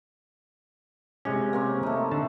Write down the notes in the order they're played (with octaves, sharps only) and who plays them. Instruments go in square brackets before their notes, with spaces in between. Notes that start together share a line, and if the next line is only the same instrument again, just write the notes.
[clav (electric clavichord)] C3 G#3 C#4 [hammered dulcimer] G4
[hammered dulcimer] A#3 C4 C#5
A3 D#4
[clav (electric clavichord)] D3 A5